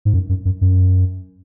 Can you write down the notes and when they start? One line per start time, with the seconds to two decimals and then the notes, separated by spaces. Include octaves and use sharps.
0.05 G#2
0.14 F#2
0.29 F#2
0.45 F#2
0.61 F#2